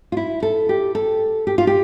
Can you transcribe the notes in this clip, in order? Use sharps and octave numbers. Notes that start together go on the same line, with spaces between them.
F4
E4
A4
G4
A4
G4
F4
G4